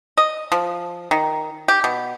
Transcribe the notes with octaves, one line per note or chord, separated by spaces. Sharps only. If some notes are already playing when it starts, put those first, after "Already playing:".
D#5
F3
D#3
G4
B2